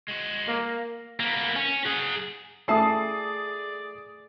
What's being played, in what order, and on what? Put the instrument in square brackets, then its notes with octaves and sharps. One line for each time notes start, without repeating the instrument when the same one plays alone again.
[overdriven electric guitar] G#3 F#4
[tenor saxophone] A#3
[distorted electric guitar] A#3 B3
C#4
G#4 F#5
[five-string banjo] E3 A5 [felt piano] A3 E5 [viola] G#4 D5 [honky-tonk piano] D#6 C7